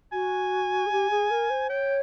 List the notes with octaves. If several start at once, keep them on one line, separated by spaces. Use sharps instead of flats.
F#4 G#5
G#4
G4
G#4
A#4
C5
C#5 G5